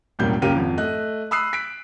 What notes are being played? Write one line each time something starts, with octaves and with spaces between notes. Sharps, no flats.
E1 F#2 A2 G3 A#3 G6
C#2 F#2 A#3 G4 A#4 D#7
G#1 F2
A3 D#5 F#6
B5 D#6 E6 F#6 C7
B6 D7